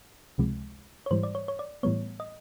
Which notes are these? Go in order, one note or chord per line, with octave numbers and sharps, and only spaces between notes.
C#2 C3 F3 G#3
C#5
G#2 E3 G3 C5
D5
C#5
C#5
D5
A2 E3 G3 B3 C#5
D#5